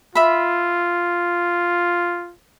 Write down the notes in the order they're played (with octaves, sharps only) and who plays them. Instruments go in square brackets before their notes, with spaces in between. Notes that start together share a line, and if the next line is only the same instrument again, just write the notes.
[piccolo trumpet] F4 [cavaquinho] E5 B5